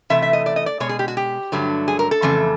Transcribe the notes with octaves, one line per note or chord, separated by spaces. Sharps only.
C3 E3 A3 E5
E5
D#5
D5
D#5
D5
B2 G#3 C#5
G#4
G4
F#4
G4
G2 D3 F#3 A3
G#4
A#4
A4
F2 C#3 E3 A3